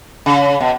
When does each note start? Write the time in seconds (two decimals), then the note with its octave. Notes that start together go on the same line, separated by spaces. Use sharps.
0.26 C#3
0.61 B2